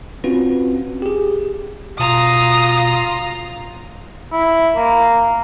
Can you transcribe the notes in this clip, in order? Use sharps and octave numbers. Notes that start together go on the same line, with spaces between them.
C4 C#4 F4 F#4 B4
G4 G#4
B2 F4 A#5 D#6
E4
A#3